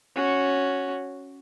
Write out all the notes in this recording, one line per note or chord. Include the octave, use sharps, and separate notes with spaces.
C#4 F#4